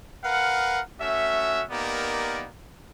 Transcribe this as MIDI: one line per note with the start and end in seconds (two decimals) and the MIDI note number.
0.24 0.81 70
0.24 0.81 71
0.24 0.81 77
0.24 0.81 78
1.00 1.63 57
1.00 1.63 61
1.00 1.63 66
1.00 1.63 76
1.71 2.47 58
1.71 2.47 59
1.71 2.47 63
1.71 2.47 67
1.71 2.47 70
1.71 2.47 74